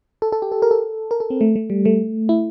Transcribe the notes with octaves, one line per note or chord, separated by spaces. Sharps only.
A4
A4
G4
A4
A#4
A4
A#4
A4
C4
A3
A3
G3
A3
E4